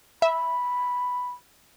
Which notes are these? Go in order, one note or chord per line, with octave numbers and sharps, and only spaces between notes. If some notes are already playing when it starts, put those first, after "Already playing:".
E5 B5